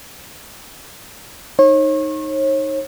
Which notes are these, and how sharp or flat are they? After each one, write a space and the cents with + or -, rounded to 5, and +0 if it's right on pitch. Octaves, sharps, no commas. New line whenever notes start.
D#4 +0 C#5 -35